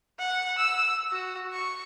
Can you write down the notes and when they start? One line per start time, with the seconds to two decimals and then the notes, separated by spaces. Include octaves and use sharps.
0.19 F#5
0.58 E6
1.11 F#4
1.53 C#6